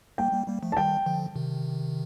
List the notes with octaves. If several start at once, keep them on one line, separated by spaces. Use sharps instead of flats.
G3 A#3 G5
G3 A#3
G3 A#3
F3 A3
A5
D#3 G3 G5
D3 F3
C3 D#3